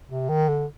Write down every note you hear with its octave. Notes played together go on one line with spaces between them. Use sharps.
C3
D#3
D3